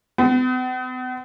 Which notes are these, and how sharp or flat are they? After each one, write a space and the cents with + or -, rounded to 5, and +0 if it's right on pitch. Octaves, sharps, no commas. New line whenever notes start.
B3 +45